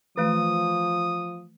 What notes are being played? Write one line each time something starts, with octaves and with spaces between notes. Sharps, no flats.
E3 F3 A3 D#6